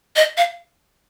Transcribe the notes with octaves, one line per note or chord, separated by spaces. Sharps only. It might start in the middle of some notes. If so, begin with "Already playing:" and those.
D#5
F5